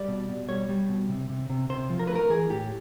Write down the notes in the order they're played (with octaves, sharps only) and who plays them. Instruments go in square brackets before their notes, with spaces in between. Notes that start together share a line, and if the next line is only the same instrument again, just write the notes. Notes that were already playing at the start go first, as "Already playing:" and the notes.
Already playing: [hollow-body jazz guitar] G3 D5
B2
B2
G3 C#5
G3
B2
C3
C3
C3
C3 C5
F3
A#4
A3 B4
A#4
E3 G#4
A2 G4